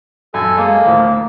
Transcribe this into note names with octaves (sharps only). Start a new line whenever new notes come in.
F#2 A4 G#5
G#3 A#3 A4
D2 A2 F3